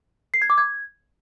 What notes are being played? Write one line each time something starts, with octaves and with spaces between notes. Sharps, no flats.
C7
G#6
D6
G#6